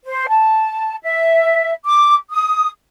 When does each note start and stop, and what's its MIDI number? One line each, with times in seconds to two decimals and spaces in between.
0.05 0.27 72
0.28 0.96 81
1.02 1.73 76
1.85 2.15 86
2.30 2.69 87